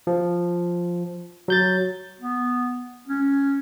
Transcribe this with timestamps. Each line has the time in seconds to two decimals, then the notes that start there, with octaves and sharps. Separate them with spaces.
0.07 F3
1.48 F#3 G6 A6
2.21 B3
3.08 C#4